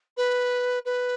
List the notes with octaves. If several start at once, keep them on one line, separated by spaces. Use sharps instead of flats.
B4
B4